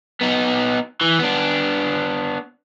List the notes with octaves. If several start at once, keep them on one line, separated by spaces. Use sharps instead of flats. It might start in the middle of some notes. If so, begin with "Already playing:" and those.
B3 D#4
E3
B3 D4